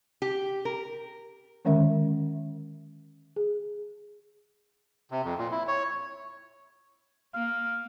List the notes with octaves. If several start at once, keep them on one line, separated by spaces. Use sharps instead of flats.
G4
A#4
D3 D#3 G#3 C#4 A#4 E5
G#4
C3
F2
A#2
E4
C#5
A#3 F5